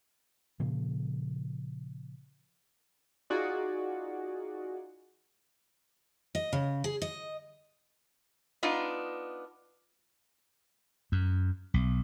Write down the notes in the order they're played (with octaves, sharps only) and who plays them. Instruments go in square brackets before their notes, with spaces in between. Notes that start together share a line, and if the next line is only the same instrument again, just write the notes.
[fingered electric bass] A#2 C#3 F3
[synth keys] D#4 F4 F#4 G#4 D5
[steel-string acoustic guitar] D#5
C#3
G#4
D#5
[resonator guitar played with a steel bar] B3 D4 D#4 F4
[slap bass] F#2
B1